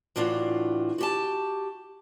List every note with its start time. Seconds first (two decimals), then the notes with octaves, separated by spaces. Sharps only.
0.16 A2 E3 D4 F4 F#4
0.98 F#4 G4 A5